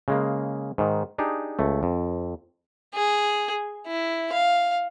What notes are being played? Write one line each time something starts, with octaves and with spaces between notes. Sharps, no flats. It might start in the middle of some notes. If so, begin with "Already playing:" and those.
C#3 G#3 A#3
G#2 D#3
D4 D#4 G4 G#4
C#2 A3
F2
G#4
E4
F5